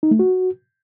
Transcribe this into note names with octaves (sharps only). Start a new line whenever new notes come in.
D#4
A3
F#4